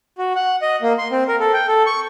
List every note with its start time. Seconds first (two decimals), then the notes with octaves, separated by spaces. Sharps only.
0.18 F#4
0.36 F#5
0.62 D#5
0.82 A#3
0.98 C6
1.12 C4
1.28 A#4
1.40 A4
1.53 G5
1.68 A4
1.86 C#6